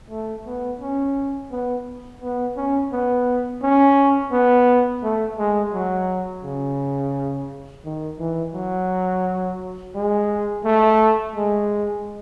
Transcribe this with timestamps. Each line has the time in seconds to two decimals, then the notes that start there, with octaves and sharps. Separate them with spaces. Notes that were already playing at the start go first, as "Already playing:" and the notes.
0.10 A3
0.47 B3
0.81 C#4
1.52 B3
2.22 B3
2.57 C#4
2.92 B3
3.63 C#4
4.32 B3
5.03 A3
5.38 G#3
5.74 F#3
6.44 C#3
7.85 D#3
8.19 E3
8.55 F#3
9.95 G#3
10.65 A3
11.36 G#3